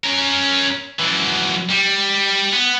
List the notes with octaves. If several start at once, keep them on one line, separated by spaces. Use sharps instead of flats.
C#4 A#4
F#2 E3
G3
B3